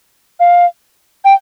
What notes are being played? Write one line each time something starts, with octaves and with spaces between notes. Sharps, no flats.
F5
G5